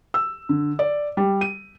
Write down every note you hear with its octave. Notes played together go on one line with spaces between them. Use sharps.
E6
D3
D5
G3
D#7